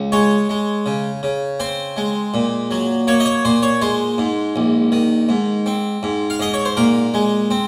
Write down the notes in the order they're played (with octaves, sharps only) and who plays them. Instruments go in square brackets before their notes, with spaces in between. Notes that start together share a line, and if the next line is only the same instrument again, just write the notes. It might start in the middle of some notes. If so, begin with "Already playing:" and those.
Already playing: [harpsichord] C#2
G#3 C#5
G#3
C#3
C#3
C4 C5
G#3
A#2
F#3
A#3 C#5
D#5
C#5
A#2 C5
C#5
G#3 C5
G#2
A#1
D#3
G#2
C4
G#2
F5
G#2 D#5
C#5
C5
A#2 A#4
G#3
C4